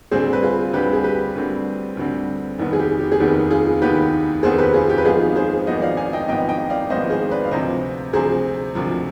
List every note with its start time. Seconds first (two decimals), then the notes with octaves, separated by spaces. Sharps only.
0.11 D2 D3 G3 C4 G#4 C5
0.33 B4
0.43 F4 G#4
0.73 D2 D3 G3 C4 G4 B4
0.93 G#4
1.04 G4 B4
1.35 D2 D3 G3 C4
1.97 D2 D3 G3 C4
2.59 F1 D#2 D#3 B3
2.73 G#4
2.79 G4
3.00 G4
3.12 G#4
3.20 F1 D#2 D#3 B3 G4
3.50 F4 G#4
3.81 F1 D#2 D#3 B3 G4 B4
4.43 F1 D#2 D#3 B3 G#4 C5
4.58 G4 B4
4.74 F4 G#4
4.90 G4
4.98 B4
5.05 G#1 G#2 F3 B3 F4 G#4
5.36 G#4 C5
5.67 G#1 G#2 F3 B3 C5 D#5
5.82 D5 F5
5.97 F5 G#5
6.13 D#5 G5
6.28 G#1 G#2 F3 B3 D#5 G5
6.49 D#5 G5
6.70 D5 F5
6.90 G#1 G#2 F3 B3 C5 D#5
7.10 G#4 C5
7.31 B4 D5
7.43 F5
7.51 D2 C3 F3 C5 D#5
8.13 D2 C3 F3 G#4 C5
8.75 D2 C3 F3